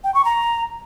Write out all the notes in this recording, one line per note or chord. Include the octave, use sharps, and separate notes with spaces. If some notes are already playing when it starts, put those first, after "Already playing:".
G5
C#6
A#5